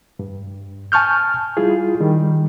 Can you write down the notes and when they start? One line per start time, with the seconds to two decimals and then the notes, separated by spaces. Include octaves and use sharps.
0.19 G2
0.92 G#5 A5 C#6 F6 G6
1.57 G3 E4 F4 G#4
2.00 D#3 G3